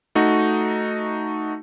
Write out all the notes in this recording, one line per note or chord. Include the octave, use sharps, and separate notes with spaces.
A3 D#4 F#4